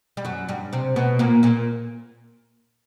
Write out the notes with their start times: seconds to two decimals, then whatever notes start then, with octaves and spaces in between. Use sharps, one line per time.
0.17 G3
0.25 F#2 F#3
0.49 G2 G3
0.73 C3 C4
0.96 B2 B3
1.19 A#2 A#3
1.43 A#2 A#3